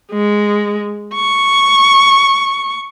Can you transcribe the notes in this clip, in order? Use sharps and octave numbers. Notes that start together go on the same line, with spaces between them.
G#3
C#6